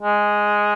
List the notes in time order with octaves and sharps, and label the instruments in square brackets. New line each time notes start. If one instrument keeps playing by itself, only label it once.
[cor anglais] G#3